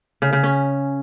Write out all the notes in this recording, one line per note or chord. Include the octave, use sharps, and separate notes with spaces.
C#3
C#3
C#4